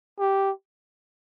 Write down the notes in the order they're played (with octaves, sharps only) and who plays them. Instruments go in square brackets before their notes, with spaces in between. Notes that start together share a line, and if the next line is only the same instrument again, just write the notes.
[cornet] G4